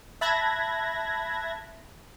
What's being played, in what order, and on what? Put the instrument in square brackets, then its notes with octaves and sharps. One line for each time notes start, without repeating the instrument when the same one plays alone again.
[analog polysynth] E5 A5 B5 F#6 G#6 A#6